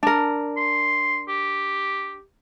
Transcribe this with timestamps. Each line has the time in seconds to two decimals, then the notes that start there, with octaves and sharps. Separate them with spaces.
0.03 D4 A#4
0.57 C6
1.28 G4